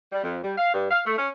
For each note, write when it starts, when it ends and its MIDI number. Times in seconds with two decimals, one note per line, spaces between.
0.12 0.22 55
0.23 0.37 41
0.43 0.54 55
0.58 0.73 77
0.74 0.89 43
0.91 1.01 77
1.06 1.15 57
1.18 1.28 61